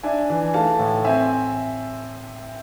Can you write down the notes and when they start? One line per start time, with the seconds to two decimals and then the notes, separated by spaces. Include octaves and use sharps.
0.03 D4 E5 G#5
0.30 E3
0.54 A3 F5 A5
0.79 A2
1.04 C4 E5 G#5